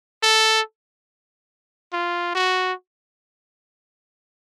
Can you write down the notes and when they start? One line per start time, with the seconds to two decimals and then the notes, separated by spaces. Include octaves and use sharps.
0.23 A4
1.93 F4
2.35 F#4